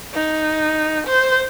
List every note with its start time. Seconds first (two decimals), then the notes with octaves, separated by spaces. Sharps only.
0.14 D#4
1.07 C5